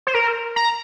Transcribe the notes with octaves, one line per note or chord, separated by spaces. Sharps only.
C5
A#4
A#5